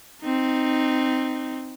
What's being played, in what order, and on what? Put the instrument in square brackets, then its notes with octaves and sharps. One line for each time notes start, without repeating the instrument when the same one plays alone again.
[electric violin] C4 D#4